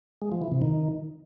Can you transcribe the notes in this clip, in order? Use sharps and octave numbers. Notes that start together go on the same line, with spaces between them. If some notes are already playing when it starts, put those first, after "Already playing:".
G#3
F3
E3
C3
D#3